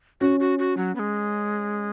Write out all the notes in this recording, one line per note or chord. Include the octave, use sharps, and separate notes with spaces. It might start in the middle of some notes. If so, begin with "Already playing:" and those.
C#4 F#4
F#4
F#4
F#3
B3
G#3